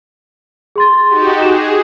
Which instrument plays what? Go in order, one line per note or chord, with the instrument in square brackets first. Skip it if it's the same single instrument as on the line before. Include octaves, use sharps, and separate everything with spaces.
[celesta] G#4 C6 A6
[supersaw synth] D#4 F#4 G4
[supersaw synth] G#4 [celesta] E7